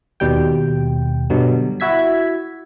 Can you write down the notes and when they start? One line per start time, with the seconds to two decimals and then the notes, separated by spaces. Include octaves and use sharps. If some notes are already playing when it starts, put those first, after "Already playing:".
0.20 D#2 B2 G3 G5
1.30 G2 B2 D3 F#3
1.80 E4 F#4 E5 G#6 B6